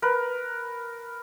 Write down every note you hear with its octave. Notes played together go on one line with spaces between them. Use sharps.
A#4 B4